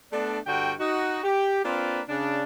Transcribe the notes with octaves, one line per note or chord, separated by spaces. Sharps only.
A3 B3 D4
G2 D3 F#4 G5
D#4 F#4
G4
A#3 C4 D4 F4 B4
C#3 D4